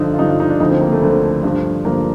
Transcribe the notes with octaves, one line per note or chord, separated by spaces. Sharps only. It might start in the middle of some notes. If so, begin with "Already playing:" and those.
Already playing: G2 D3 F3 D#4
F4
G2 D3 F3 D#4
F4
D#4
D4
D2 D3 F3 D#4
C4
A#3
A3
D2 D3 F3
G2 D3 F3
G2 D3 F3 A#3